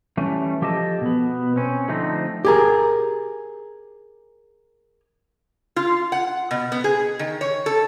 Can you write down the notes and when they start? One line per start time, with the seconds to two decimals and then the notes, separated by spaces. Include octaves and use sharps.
0.17 E3 G3 A3 C#4
0.62 F3 G4 A4 D#5 A5
1.01 B2 B3
1.56 C4 C#4
1.88 D3 F3 A3 C4 D#4
2.45 G4 G#4 A#4
5.76 F4
6.12 F#5
6.51 B2
6.72 B3
6.84 G#4
7.19 D#3
7.41 C#5
7.66 A4